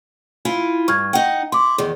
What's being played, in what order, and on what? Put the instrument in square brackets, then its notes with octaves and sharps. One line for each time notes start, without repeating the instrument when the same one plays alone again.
[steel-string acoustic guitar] E4 F4 G#5
[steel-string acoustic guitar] G2 [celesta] C#6 F6 G#6
[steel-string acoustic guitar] D#4 F#5 [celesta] G5
[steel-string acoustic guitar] E4 [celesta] C6 D6
[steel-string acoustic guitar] E2 D#3 [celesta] G#4